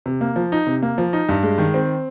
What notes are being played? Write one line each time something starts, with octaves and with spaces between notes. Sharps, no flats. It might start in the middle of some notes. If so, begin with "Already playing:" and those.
C3
A#3
F3
D#4
C3
A#3
F3
D#4
G2
G#3
D#3
C4